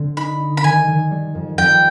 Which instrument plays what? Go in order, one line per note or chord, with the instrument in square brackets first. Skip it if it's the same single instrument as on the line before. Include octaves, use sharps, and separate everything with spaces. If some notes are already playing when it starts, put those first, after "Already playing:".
Already playing: [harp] D3 C4
[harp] D#4 [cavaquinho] B5
[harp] D#4
[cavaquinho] B5
[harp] D#3 [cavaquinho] G#5
[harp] D#3
G3
F2
[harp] F2 [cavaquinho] G5